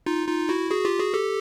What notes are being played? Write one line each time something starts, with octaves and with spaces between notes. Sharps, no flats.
D#4 F4
D#4 F4
E4 F#4
F#4 G#4
F4 G4
F#4 G#4
G4 A4